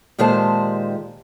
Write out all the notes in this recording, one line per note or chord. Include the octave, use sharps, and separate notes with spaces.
A#2 D#3 G#3 G4 C5 A5